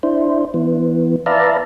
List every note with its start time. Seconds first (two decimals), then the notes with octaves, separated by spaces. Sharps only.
0.03 D4 E4 C5
0.54 E3 B3
1.26 B4 D5 E5 F5 A5 A#5